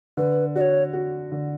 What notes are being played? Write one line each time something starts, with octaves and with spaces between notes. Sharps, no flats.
D3 B4
F#4 D5
C#5
F#4
D3